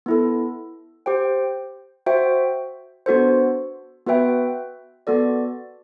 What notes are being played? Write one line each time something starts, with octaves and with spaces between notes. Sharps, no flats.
B3 E4 A4
G4 C5 G5
F#4 C5 E5 G5
B3 D4 F#4 A4 C5
B3 F#4 B4 E5 G5
B3 F#4 A4 D5